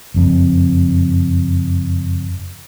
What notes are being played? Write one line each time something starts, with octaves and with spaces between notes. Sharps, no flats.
F#1 F2